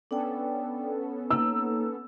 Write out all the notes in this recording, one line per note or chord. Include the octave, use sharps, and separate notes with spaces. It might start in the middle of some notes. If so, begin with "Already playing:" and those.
B3 C#4 D4 A4 D5 G5
A#3 D#4 E6